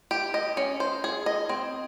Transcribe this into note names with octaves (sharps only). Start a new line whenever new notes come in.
G4
D#5
C#4
C5
G#4
D#5
C4